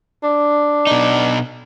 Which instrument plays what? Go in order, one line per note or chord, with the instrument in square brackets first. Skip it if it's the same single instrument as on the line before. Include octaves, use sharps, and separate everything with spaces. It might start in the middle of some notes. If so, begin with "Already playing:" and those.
[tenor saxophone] D4
[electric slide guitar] B2 D#4